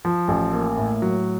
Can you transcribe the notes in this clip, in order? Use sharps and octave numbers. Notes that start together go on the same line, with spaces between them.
F3
A1
A#3
A2
F#3